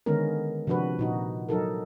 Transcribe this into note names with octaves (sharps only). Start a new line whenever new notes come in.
D3 D#3 G#3 B3 C#4 A#4
C3 F3 D4 F#4 B4
A#2 D#4 F#4
F#3 D#4 A4 A#4